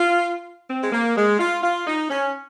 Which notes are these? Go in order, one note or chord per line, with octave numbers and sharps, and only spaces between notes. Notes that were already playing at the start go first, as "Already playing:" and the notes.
Already playing: F4
C4
G#3
A#3
G#3
F4
F4
D#4
C#4